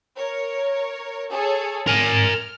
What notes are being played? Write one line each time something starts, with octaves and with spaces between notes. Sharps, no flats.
A#4 C#5
G#4 A4 C#5
A#4 G#5 F6